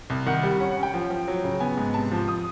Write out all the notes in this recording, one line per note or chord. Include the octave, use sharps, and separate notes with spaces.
C2
D#3 F#5
G3
C#4 F#5
F#5
C#4
G5
F3
F3
F#3
C#3
B3 G#5
G#2
C3 A5
F3
D#6